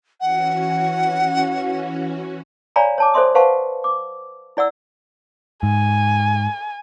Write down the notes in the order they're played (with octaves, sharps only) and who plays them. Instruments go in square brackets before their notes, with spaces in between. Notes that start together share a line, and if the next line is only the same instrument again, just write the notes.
[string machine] E3 C#4 F#4 [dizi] F#5
[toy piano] C#5 D5 F5 G#5 A#5 B5
C#5 A5 D6
A4 C5 D5 E5 C6 D#6
B4 C5 F5 F#5 A5 C#6
D6
E4 D5 F#5 E6
[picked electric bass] G#2 [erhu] G#5